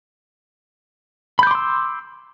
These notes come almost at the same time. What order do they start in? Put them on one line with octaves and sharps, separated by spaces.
B5 G6 D6 C6 E6